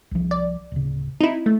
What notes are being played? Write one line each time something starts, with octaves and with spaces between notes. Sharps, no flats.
C2 F3
D5
D1 C#3
C4 D#4 E4
A3